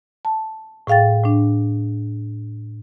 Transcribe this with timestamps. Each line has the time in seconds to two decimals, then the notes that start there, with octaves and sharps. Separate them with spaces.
0.25 A5
0.87 A2 G#4 F5 G5 A6
1.24 A2 D4